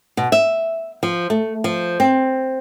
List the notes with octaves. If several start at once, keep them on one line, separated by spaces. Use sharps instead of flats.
B2
E5
F3
A3
F3
C4